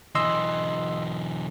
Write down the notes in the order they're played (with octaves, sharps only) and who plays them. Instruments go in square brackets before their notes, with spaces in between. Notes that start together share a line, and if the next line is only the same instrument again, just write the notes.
[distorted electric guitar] B1 E3 [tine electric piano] D#5 C6 E6